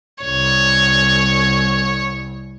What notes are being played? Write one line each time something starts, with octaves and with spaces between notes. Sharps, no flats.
C2 C#5